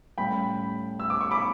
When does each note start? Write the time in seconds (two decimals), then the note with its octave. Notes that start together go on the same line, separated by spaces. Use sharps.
0.18 A2 G3 C#4 G5 B5
1.00 E6
1.10 D6
1.21 C#6
1.31 B5 D6